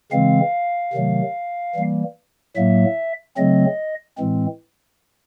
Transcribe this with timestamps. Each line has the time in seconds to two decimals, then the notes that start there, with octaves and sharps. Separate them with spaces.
0.12 C#3 E3 G#3 C4 F5
0.93 C3 D#3 F#3 A3
1.75 E3 G3 A#3
2.56 A2 F#3 A#3 E5
3.37 C#3 F#3 A3 C4 D#5
4.18 A2 E3 G#3 C4